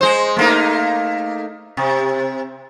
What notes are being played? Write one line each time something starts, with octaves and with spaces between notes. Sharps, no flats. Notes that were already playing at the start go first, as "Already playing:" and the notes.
G#3 C5
A3 A#3 D#4
C3